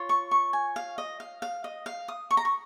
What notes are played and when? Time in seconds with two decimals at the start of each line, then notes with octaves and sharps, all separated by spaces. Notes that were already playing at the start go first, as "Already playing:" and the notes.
Already playing: F4 C#5
0.09 C#6
0.31 C#6
0.53 G#5
0.76 F5
0.98 D#5
1.20 F5
1.42 F5
1.64 D#5
1.86 F5
2.08 D#6
2.31 C#6
2.37 A#5
2.45 C#6